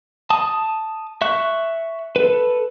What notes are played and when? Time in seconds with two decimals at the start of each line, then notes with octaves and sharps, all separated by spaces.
0.30 A5 D#6
1.22 E5 C#6 F#6
2.16 A4 B4